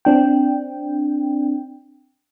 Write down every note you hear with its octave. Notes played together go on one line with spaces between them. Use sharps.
C4 D4 G5